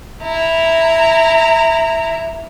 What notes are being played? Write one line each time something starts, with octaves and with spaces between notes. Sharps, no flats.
E4 A#5